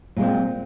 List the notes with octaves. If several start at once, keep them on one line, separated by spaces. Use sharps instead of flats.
A#2 G#3 C4